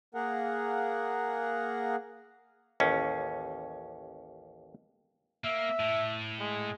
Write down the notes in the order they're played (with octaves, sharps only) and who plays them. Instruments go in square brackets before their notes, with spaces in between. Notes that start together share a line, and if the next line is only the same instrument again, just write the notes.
[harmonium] A#3 G#4 A#4 F#5
[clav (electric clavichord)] A1 D#2 C#4
[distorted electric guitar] A#3 [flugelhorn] E5
[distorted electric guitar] A2
[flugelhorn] G#3